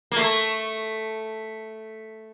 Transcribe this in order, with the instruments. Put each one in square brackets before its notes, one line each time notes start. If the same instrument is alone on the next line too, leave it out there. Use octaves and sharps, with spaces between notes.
[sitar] A#3
A3